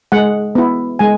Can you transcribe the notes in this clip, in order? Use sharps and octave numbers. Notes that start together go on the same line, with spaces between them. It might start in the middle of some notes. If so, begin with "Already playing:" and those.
G#3 F#5
B3 E4
G#3 G#5